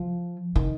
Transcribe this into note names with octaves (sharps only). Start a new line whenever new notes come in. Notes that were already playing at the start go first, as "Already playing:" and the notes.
Already playing: F3
D#3